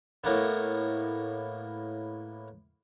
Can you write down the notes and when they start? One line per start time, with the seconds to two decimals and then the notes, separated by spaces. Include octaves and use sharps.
0.24 A2 A#3 B3